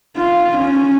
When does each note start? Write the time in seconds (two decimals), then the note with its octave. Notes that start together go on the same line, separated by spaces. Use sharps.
0.17 F4
0.58 C#4